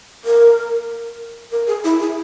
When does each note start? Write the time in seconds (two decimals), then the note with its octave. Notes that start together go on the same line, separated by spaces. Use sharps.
0.25 A#4
1.52 A#4
1.67 G#4
1.84 E4
2.00 G#4